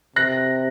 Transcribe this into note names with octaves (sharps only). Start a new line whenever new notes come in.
C3 F#6 A#6